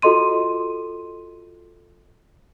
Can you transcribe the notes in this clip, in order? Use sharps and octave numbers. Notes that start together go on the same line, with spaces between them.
F4 F#4 A4 D#5 C6 D#7